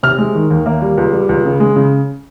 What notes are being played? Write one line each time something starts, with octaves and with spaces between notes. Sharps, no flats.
C3 F6
G#3
D#3
D#2
A#3
G3
C#2
G3
C#2
C#3
G#3
C#3